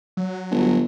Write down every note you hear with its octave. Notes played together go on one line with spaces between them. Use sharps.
F#3
G1